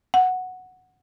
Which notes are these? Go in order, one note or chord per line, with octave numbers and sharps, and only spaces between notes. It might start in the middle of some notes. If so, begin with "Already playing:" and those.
F#5